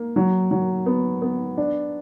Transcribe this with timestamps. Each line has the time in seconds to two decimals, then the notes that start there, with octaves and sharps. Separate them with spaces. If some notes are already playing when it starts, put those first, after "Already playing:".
Already playing: A#3
0.16 F#3
0.51 F#3
0.86 B3
1.22 B3
1.57 D4